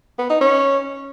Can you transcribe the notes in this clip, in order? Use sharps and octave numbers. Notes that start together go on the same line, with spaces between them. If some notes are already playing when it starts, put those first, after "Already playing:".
B3
D#4
C#4